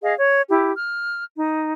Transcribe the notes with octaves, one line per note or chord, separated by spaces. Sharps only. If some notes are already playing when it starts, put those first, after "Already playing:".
G#4 D#5 F5
C#5
E4 G4
F6
D#4